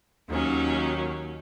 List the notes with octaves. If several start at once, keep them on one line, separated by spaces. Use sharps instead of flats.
D#2 D#3 F#3 C#4